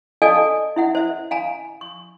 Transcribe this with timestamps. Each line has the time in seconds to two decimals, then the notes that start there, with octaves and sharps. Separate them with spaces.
0.22 A4 D5 D#5 F5 G#5 A5
0.76 E4 E5 F#5
0.95 C5 E5
1.31 F5 G#5 A#5
1.81 C#6